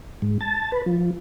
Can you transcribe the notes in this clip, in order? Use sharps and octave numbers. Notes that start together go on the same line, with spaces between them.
G#2
A5
B4
F3